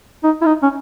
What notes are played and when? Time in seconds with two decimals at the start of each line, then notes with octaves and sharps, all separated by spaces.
0.24 D#4
0.42 E4
0.46 D#4
0.63 C#4